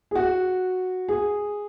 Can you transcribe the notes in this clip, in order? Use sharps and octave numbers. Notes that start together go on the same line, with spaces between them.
G#4
F#4
G#4